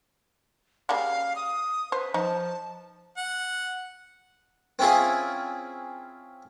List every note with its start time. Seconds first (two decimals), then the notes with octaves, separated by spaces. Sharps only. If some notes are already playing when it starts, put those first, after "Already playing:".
0.89 C#3 G3 A#3 F5
1.36 D#6
1.92 B4 C5
2.14 F3 D#4 A5
3.17 F#5
4.79 C4 C#4 E4 F4 G#4